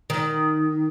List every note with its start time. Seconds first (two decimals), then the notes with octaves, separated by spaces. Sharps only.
0.10 D#3